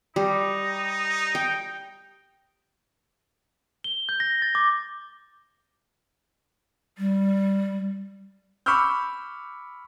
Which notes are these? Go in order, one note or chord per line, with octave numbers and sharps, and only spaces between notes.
G3 D#4
G5
G7
G6
A#6
A6
D6
G3
B5 C#6 D6 E6 F6 G6